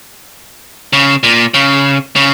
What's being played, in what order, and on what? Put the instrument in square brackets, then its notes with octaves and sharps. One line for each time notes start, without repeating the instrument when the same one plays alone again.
[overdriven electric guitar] C#3
A#2
C#3
C#3